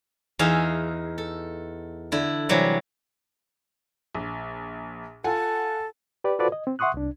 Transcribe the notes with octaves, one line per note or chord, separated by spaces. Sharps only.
E2 D#4 G#4 E5 F5
A4
D3 E4
C3 E3 F#3 G3
A#1
F4 A4 F#5 G#5
G4 B4 D5
F4 F#4 A4 B4 C5 D5
D#5
C4
E5 F#5 C6 C#6 D#6 F#6
C2 D4